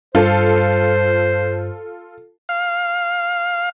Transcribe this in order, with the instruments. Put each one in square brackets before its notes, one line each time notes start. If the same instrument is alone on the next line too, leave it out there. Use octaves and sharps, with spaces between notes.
[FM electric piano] G2 [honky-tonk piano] F4 A4 [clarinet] C5
[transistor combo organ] F5